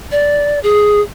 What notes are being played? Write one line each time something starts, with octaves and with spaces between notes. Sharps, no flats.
D5
G#4